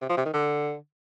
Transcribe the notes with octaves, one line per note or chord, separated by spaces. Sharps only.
C3
F3
C3
D#3
D3